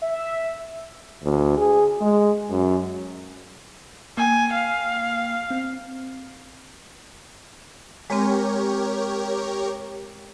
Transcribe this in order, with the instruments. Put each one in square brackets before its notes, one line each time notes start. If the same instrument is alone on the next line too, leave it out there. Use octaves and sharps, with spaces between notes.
[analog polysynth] E5
[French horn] D2
G#4
G#3
F#2
[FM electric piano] A#3 G5 [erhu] G#5
[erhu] F5
[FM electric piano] C4
[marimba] G#3 C4 [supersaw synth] G4 A#4 C#5